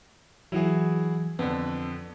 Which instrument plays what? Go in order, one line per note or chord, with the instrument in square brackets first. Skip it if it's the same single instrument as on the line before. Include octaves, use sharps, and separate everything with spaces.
[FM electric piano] E3 F#3 [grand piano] E4 F#4 G#4
[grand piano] F2 D3 [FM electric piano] B3